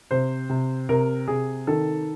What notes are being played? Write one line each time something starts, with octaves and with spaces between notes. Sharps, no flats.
C3 C5
C3
C3 A#4
C3 G#4
D#3 A4